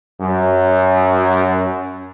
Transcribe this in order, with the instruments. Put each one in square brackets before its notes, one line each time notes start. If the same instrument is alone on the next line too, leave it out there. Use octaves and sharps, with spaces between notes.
[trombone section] F#2 F#3